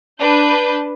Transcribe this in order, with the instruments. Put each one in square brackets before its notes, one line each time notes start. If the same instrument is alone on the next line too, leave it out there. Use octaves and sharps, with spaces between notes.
[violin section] D4 B4 A5 G6